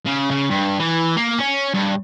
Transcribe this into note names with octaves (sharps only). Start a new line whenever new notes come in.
C#3
C#3
G2
E3
A#3
C#4
G2